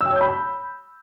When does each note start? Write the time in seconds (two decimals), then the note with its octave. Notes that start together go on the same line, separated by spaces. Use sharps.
0.01 E6
0.06 G5
0.11 C#5
0.16 G6
0.21 B5